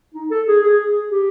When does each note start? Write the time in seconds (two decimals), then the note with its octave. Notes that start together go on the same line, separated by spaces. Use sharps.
0.15 D#4
0.31 A4
0.47 G#4
0.63 G#4
0.87 G#4
1.11 G4